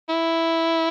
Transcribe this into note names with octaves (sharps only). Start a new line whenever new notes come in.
E4